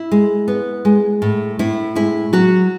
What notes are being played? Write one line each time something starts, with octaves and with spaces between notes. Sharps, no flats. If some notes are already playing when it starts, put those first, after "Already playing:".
Already playing: E4
G#3
B3
G#3
A2
A2 E4
G#3 E4
F#3 F#4